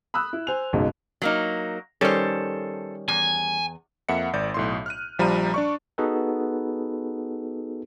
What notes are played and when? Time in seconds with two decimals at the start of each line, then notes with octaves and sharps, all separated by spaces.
0.14 B5 D#6 E6 F#6
0.33 E4
0.47 C5 G#5 F7
0.73 F#1 B1 G#2
1.22 F#3 A#3 D#4
2.01 D#3 G3 C#4 A4 C5
3.08 E2 G#5
4.09 F2 A#3 E5 F#5 C#7
4.33 G#1 D5 G6
4.54 B1 A2 C6
4.86 F6 F#6 D#7
5.19 A#1 F3 G3 A#5 B5 D#7
5.54 D4 D5 C#6
5.98 B3 D#4 F#4 G#4 A4 B4